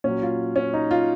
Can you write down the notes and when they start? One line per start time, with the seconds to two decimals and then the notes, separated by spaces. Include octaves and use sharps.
0.04 A#2 F#3 C#4
0.22 F4
0.56 C#4
0.74 D#4
0.91 F4